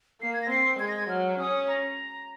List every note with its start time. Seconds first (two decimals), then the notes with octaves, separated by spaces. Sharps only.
0.21 A#3 C7
0.33 G#6
0.42 A#6
0.50 C4 C7
0.79 G#3 G#6
0.88 A#6
0.96 G#6
1.09 F#3 F6
1.39 C#4 D#6
1.68 A#5